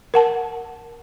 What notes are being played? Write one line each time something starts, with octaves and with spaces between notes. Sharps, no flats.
A#4 F#5 A5